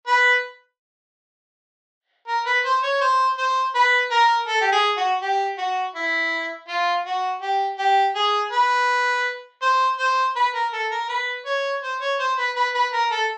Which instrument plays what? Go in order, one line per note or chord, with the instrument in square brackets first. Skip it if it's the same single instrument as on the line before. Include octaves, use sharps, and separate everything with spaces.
[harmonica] B4
A#4
B4
C5
C#5
C5
C5
B4
A#4
A4
G4
G#4
F#4
G4
F#4
E4
F4
F#4
G4
G4
G#4
B4
C5
C5
B4
A#4
A4
A#4
B4
C#5
C5
C#5
C5
B4
B4
B4
A#4
A4